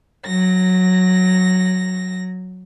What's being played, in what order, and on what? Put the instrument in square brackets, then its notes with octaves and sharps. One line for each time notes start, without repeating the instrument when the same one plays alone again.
[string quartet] F#3 A#6